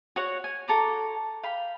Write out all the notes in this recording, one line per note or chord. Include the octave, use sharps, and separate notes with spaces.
F#4 C#5 F#5
G#5
F#4 A4 A#5 D6
F5 G5 B5